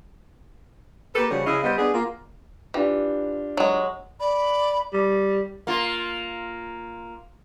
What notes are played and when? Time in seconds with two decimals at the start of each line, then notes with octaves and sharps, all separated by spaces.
1.15 A#3 G4 A4 B4
1.29 C#3 F3 G3 F#4 C#5
1.46 C#3 E4 G#4 D#5 F5
1.63 G3 B3 C5 D#5
1.78 B3 D4 G#4
1.93 A#3 F4
2.74 E3 D4 F4 G4
3.57 F#3 G#3
4.20 D5 B5
4.93 G3
5.67 A#3 F4